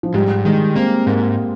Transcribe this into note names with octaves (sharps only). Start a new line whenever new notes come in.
F3
G#2 G3
D#3 G#3
A#3 C4
G#2 A#3